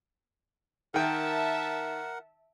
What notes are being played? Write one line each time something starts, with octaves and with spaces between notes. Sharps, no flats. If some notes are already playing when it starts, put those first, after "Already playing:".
D#3 A#4 E5 F#5 G5 A5